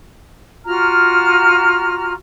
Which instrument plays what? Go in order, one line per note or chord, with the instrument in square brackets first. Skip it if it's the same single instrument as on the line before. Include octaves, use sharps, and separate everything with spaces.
[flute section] F4 F#4 A#5 F6